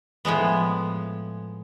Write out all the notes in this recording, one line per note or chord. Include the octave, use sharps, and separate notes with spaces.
A2 F3 G#3 B3